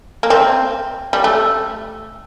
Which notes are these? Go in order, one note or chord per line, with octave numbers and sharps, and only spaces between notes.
A#3
C4
G3
A3